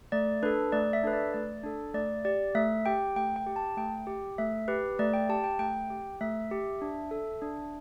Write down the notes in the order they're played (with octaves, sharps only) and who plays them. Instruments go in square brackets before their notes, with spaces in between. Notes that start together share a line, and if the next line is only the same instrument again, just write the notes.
[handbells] A3 D5
D4 A4 B4
A3 D5
E5
D4 A4 B4
D5
A3 D5
D4 A4
A3 D5
G4 D5
A3 E5
G4 G5
A3 G5
G5
G4
A5
A3 G5
G4
A3 E5
G4 B4
A3 D5
G5
G4 A5
G5
A3 G5
G4
A3 E5
G4
D4
A4
D4